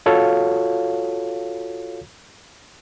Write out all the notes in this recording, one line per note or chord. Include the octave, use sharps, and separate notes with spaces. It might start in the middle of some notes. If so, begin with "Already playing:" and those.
F4 F#4 A4 C#5 F5